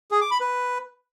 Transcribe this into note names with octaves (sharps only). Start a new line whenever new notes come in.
G#4
D6
B5
B4